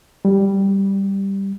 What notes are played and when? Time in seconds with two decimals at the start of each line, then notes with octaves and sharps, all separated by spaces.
0.25 G3